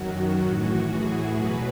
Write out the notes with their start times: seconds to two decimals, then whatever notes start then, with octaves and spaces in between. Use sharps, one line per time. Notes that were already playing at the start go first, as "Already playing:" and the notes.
Already playing: F#2 D#3 F#3 F#4
0.43 A2 E3
0.89 G#4
1.35 E2 B2 F#3 B4